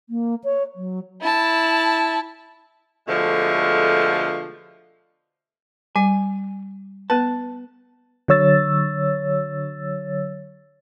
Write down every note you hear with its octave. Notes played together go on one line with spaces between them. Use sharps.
A#3
C#5
F#3
E4 A5
B2 D3 F3 G#3 A3
G3 G#5
B3 B4 A5
D3 F#3 C#5 E6 A6